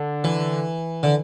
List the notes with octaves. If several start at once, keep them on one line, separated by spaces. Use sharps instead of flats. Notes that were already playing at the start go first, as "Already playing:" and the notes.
Already playing: D3
E3
D3